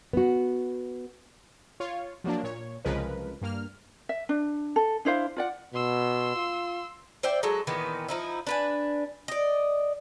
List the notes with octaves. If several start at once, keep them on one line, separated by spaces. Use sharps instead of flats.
B3 F#4
F4 C#5 F5
F3 F#3 A#3 D4
A#2 C#5
C2 C#3 F3 G#3 A#4 B4
G2 A#3 F6
E5
D4
A4
D4 E4 C5 F5
F4 D5 F#5
B2 C6 E6
F4
C5 D5 E5 G5
F#3 G#3 A4
A#2 D#3 E3 B3
F3 D#4 E4
D4 B4 G#5
D5 D#5